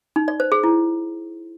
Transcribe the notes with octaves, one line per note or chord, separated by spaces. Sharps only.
D#4
D5
C5
G#4
E4